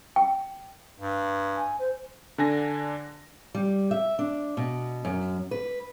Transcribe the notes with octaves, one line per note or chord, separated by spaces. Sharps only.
G5
G2
G#5
C5
D3 D4 G#5 A#6
G3
E5
D4
B2
F#2
B4